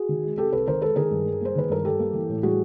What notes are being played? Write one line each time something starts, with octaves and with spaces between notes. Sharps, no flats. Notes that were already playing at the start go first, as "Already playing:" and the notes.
Already playing: F#4 G#4
D#3
G#3
C3 G4 A4
C2 A4 B4
D#3 A#4 C5
G#3 A4 B4
D#3 G#4 A#4
G2
G3
A#3 C5
D#3 B4
G2 A#4
G3 G4 A4
A#3
E3
A2
G3 F#4 G#4